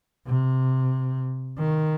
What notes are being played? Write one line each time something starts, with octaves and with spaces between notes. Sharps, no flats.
C3
D#3